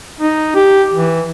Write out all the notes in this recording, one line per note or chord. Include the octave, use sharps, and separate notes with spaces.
D#4
G4
E3